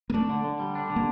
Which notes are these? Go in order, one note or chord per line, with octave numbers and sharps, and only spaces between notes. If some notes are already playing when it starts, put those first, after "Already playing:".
A#3
A3 D4
D3
D3
G3
D4
D3
A#3